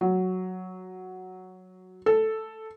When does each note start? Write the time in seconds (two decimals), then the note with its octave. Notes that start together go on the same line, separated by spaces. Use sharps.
0.01 F#3
2.06 A4